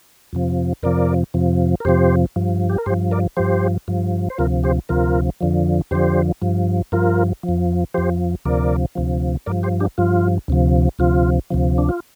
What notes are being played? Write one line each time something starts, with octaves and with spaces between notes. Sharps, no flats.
F2 C3 F3
F2 C3 F3 A#4 D5
F2 C3 F3
A#4
F2 C3 F3 G4 C5
G2 F3
G4
A#4
G2 F3 G4 C5
A#4 D5
G2 F3 G4 C5
G2 F3
C5
D2 C3 F3 F4 A#4
G4 C5
D2 C3 F3 F4 A#4
F2 D3 F3
F2 D3 F3 G4 C5
G2 F3
G2 F3 F4 A#4
F3
F2
F2 F3 G4 C5
D2 C3 F3 A#4 D5
D2 C3 F3
G2 F3 A#4 D5
G4 C5
D4 G4
G2 F3 F4
D2 C3 F3
D2 C3 F3 F4
D2 C3 F3
D4
F4